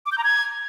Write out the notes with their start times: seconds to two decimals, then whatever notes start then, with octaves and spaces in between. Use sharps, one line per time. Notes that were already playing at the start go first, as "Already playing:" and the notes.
0.06 D6
0.12 G6
0.18 A#5
0.24 G#6